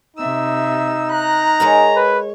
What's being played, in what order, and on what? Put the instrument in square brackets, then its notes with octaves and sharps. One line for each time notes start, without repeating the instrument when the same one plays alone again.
[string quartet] C3 E5 E6 [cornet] D#4
[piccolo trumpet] A#5 [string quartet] F#6
[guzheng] G#3 A#4 F#5 [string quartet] C#5
[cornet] B4